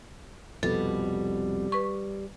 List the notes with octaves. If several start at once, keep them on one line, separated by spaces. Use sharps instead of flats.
C2 F2 B2 G3 A4
B4 C#6